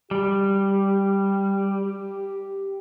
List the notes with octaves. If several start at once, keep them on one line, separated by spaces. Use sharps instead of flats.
G3 G4